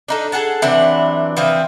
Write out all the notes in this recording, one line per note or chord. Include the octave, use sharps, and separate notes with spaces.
D4 D#4 A4
G#4 A4 F#5 A5
C3 E3 F#3 D4
E3 F3 C4